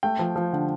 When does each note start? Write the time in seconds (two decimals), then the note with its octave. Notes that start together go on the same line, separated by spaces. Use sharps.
0.03 A3 G5
0.19 F3
0.36 F3
0.53 D3